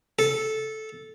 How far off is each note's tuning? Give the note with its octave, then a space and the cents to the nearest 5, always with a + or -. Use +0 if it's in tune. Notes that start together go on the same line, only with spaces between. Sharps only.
A4 -10